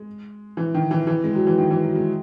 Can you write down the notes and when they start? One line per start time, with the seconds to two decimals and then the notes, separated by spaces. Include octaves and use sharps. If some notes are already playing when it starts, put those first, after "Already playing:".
Already playing: G#3
0.57 E3
0.74 D#3
0.91 E3
1.07 E3
1.24 G#3
1.35 F#3
1.47 E3
1.58 D#3
1.71 E3
1.84 F#3
1.95 G#3